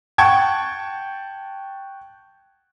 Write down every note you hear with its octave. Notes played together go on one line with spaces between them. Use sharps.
F#5 G5 A5 C#6 G#6